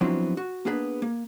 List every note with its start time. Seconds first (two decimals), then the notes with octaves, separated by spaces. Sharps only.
0.01 F3 F#3 B3 C4 D4 E4
0.37 F#4
0.65 A#3 B3 D4 G#4 B4
1.02 A#3